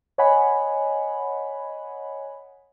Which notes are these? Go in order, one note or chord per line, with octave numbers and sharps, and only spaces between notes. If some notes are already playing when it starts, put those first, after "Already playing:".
C#5 D#5 F#5 G#5 B5